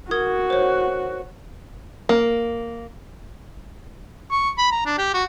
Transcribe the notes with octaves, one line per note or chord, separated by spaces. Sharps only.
F#4 A#4 D#6 G#6
C5 C#5
A#3
C#6
B5
A#5
D4
G4
F#4